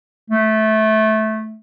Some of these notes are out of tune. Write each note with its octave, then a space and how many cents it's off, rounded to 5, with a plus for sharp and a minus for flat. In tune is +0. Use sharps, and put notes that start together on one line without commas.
A3 -15